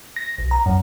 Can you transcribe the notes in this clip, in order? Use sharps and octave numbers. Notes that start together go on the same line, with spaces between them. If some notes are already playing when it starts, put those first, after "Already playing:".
A#6
B1
A#5
F#2